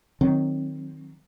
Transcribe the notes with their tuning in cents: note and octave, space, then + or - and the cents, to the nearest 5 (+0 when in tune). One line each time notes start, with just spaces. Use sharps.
D#3 +0 F#3 +0 C4 +15